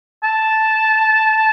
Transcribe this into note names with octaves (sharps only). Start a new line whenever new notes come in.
A5